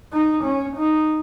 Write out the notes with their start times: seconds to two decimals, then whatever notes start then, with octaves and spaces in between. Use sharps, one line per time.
0.12 D#4
0.44 C#4
0.77 D#4